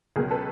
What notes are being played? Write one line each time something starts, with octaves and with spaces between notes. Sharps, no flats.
C#2 B2 F#3 G#4 A#4
A4 B4